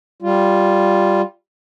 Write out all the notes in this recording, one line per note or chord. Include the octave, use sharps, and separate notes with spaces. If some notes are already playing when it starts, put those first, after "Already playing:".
G3 F4